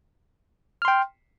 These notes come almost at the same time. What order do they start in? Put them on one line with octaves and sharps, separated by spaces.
F6 C6 G5